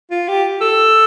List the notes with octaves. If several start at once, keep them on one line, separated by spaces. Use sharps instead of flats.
F4
G4
A4